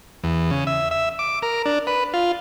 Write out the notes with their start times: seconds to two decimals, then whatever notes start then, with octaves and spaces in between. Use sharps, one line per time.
0.24 E2
0.51 C#3
0.67 E5
0.91 E5
1.19 D6
1.42 A#4
1.66 D4
1.87 B4
2.14 F4